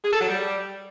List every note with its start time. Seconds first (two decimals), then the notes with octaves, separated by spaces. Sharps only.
0.04 G#4
0.12 A4
0.20 F#3
0.28 G3